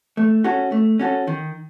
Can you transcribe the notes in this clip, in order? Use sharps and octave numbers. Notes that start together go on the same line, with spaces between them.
A3
C#4 F#4 A4
A3
C#4 F#4 A4
D#3